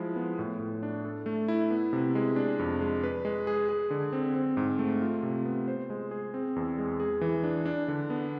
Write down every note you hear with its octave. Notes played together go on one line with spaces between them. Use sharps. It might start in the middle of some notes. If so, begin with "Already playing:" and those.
Already playing: F3 G#3 E4
B3
A2
A2
D4
A4
A3
E4
B3
C3
G#3
D4
F2
G#3
B4
G#3
G#4
G#4
D3
C4
C4
G#2
A3
F4
C3
B3
C5
G#3
G#4
C4
E2
G#3
G#4
E3
D4
D4
D3
B3